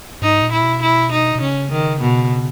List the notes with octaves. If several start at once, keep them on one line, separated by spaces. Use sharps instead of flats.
G#2 D#4
A#2
E4
B2
E4
D#4
B2
C#3 C#4
D#3
B2